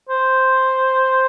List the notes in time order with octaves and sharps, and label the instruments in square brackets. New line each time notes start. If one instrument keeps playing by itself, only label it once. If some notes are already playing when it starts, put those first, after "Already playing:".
[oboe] C5